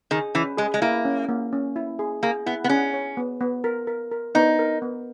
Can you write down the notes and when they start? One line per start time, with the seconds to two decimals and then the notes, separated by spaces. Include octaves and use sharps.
0.11 D#3 G#4
0.35 E3 C#4
0.58 G#3 G#4
0.74 G#3
0.82 A#3 E4
1.05 C#4
1.29 A#3
1.53 C#4
1.76 E4
1.99 G#4
2.23 A#3 G#4
2.46 B3 E4
2.64 B3
2.69 C#4 G#4
2.94 C#5
3.17 B3
3.41 B3
3.64 A#4
3.87 A#4
4.11 A#4
4.35 B3 D#4
4.59 A#4
4.82 B3